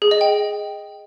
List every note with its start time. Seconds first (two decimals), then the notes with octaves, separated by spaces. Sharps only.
0.02 G#4
0.11 D#5
0.21 G5